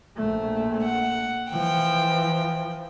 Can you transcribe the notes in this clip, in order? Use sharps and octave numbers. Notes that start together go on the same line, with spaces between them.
A#1 A3
F#5
E3 F3 G5